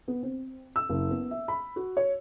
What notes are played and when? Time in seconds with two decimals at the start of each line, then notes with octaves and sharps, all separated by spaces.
0.08 B3
0.23 C4
0.76 E6
0.89 F#1
1.10 B3
1.31 E5
1.48 B5
1.76 F#4
1.97 C#5